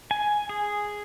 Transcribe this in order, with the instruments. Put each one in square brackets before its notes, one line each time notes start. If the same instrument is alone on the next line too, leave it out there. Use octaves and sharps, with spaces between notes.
[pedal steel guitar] G#5
G#4